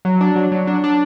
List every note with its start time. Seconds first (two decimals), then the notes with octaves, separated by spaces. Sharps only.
0.05 F#3
0.21 D4
0.36 F#3
0.52 F#3
0.67 D4
0.84 D4